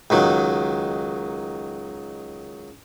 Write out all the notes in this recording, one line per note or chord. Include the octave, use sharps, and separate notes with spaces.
C#2 D#3 F#3